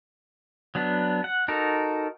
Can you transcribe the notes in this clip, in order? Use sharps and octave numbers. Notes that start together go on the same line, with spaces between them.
F#3 B3 D4
F#5
D#4 F#4 A4 A#4